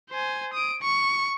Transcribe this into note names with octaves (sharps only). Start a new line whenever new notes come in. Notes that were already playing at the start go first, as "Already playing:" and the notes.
C5 G#5
D#6 D7
C#6